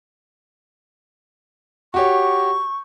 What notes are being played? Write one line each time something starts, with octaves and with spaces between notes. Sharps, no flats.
F#4 G4 C#5 C#6